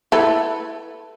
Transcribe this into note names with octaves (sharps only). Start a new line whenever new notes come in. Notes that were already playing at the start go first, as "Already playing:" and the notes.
E4 A4 B4